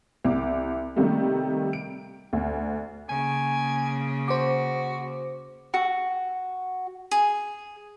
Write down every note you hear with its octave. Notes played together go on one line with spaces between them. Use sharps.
C2 D6
C3 D#3 G3 A3 A#3
D7
D2
C#3 A#3 G#5
F#4 C5 D6
F#4
G#4